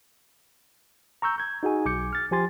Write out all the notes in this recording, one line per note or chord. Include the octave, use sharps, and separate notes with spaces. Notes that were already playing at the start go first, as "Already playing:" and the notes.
A#5 C#6 E6 G6
G6 G#6
D#4 F#4 G#4 G#5
B1 D6 G6 C#7
F6 A6
F3 G4 G#5 C6 A6